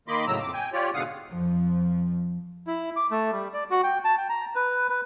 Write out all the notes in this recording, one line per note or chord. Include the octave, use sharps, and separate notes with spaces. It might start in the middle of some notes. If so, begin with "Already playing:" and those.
D#3 A#3 D#5 B5 C6 D6
A2 C#3 F#3 A#5 E6
F2 D6
G5 G#5
F4 G4 C#5 D5
G#2 B2 D3 F5 F#5 D#6
F2 F3
E4
D6
A3
G3
D5
F#4
G5
A5
G5
A#5
B4
B4